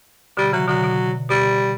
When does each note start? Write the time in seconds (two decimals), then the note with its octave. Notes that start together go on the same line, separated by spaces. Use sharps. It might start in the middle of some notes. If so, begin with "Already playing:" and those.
0.37 B2 D3 G3
0.53 C#3 E3 F#3
0.68 B2 D3 F#3
0.84 B2
1.29 B2 G3